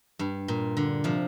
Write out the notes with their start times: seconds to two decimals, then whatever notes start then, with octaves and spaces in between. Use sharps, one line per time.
0.19 G2
0.48 A#2
0.77 D3
1.04 C3 F3